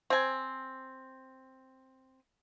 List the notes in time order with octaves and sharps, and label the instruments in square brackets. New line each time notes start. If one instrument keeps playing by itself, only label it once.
[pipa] C4 G#5